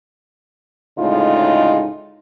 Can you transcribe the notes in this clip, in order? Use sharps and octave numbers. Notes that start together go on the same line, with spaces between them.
D2 A2 C#3 G#3 D#4 F4